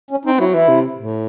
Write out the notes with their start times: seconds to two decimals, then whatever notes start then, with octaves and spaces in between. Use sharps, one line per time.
0.11 C#4
0.25 C4 D#4
0.39 F#3 E4
0.53 E3 E4
0.69 C3
0.97 A2